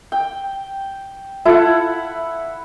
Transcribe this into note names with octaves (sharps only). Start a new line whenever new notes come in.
G5
E4 F4 A4 E5 F#5